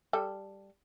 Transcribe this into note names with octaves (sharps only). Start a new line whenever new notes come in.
G3 A4